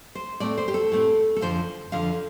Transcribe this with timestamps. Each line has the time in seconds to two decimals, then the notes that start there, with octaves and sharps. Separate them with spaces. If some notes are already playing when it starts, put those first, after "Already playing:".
0.15 C5
0.40 A2 A3 C4 D5
0.58 C5
0.68 G4
0.74 A4
0.92 A2 A3 C4
1.37 A4
1.41 F2 D3 F3 C5
1.92 F2 D3 F3 F5